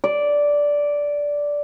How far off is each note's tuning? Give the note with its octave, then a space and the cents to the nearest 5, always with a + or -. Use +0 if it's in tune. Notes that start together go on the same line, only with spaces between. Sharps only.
D5 -10